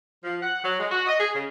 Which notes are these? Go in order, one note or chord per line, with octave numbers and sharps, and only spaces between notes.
F3
F#5
F#3
G#3
F#4
D#5
G#4
C#3